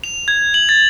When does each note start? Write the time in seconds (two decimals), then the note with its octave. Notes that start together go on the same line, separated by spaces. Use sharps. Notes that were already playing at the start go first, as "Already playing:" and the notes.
0.04 F7
0.28 G#6
0.54 F#7
0.69 A6